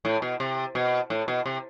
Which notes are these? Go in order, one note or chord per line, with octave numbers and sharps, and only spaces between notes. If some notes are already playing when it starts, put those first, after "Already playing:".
A2
B2
C3
B2
A2
B2
C3